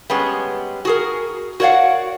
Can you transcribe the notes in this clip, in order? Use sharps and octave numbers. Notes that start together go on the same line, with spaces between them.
G3 G#3 B3 C#4
F#4 G#4 A#4
F#4 A#4 C#5 D5 F5 F#5